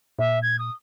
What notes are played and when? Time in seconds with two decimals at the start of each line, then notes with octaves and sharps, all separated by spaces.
0.19 A#2 E5
0.42 G#6
0.59 D#6